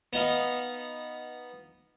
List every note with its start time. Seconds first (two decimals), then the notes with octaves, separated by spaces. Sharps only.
0.13 B3 D#4 F5